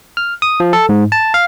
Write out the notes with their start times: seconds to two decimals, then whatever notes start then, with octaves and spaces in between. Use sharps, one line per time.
0.17 F6
0.42 D#6
0.60 F3
0.73 A4
0.89 G#2
1.12 A5
1.34 F5